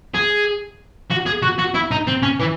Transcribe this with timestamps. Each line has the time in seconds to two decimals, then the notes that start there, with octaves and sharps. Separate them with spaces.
0.14 G#4
1.10 F#4
1.26 G#4
1.42 F#4
1.59 F#4
1.75 E4
1.91 D#4
2.07 C4
2.22 C#4
2.40 E3